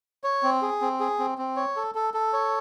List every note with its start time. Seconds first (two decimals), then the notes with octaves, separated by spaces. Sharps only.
0.24 C#5
0.43 C4
0.62 G#4
0.81 C4
1.00 G#4
1.19 C4
1.38 C4
1.56 C#5
1.76 A4
1.95 A4
2.14 A4
2.33 C#5